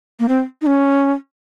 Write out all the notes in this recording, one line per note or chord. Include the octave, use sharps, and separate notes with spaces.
A#3
C4
D#4
C#4